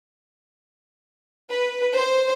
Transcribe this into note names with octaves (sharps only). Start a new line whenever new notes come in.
B4
C5